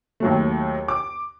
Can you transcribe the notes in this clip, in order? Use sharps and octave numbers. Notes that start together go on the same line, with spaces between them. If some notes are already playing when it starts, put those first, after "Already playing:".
D#2 F#3 A3
D6